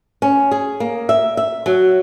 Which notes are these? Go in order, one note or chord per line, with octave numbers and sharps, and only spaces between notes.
C#4
G#4
A#3
E5
E5
F#3